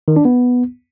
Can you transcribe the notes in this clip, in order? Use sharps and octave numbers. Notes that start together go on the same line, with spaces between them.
D#3
D4
B3